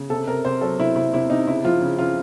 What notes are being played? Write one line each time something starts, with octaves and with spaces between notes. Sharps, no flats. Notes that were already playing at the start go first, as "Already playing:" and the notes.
Already playing: C#3
C3 A4
C3 A#4
C3 C5
F#3 A4
C3 E4
C3 E4
C3 E4
C3 D#4
C#3 E4
F3 F4
C#3
C#3 F4